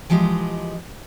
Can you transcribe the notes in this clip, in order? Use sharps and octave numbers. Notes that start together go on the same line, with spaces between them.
E3 F3 G#3 G4 D#5